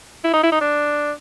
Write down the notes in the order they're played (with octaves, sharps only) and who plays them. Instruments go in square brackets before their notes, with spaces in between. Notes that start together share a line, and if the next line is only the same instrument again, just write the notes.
[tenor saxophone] E4
D#4
E4
D#4
D4